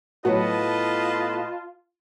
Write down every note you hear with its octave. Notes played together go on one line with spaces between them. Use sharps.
A2 F#3 B3 F4 F#4 B4 D#5 A5